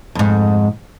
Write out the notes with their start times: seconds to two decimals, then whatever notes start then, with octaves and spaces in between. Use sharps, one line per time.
0.15 F2 G#2